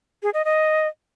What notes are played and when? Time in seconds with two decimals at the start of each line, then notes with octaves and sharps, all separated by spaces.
0.23 G#4
0.34 D#5
0.45 D#5